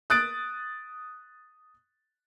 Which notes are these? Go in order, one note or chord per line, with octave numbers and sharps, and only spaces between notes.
D#6 F#6 A6 D7